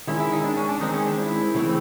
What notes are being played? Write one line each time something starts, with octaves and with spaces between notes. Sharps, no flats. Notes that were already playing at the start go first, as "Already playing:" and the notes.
D#3 G#3 C#4 E4
E4
D#4
D4
C#4
D4
D#3 G#3 C4 D#4
C#4
D4
E4
C#3 E3 A3 C4